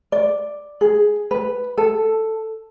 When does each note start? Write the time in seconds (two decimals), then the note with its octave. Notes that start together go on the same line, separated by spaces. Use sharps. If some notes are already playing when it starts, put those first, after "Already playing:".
0.12 D5
0.81 G#4
1.31 B4
1.77 A4